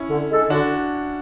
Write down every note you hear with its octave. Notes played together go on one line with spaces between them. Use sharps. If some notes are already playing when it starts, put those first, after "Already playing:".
Already playing: C#4 E4
D3
G#3 D4 A4
D3 D4 F#4